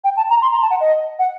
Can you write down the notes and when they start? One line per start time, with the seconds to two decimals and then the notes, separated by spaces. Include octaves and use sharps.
0.04 G5
0.17 A5
0.30 A#5
0.42 C6
0.52 A#5
0.62 A5
0.71 F#5
0.80 D#5
1.19 F#5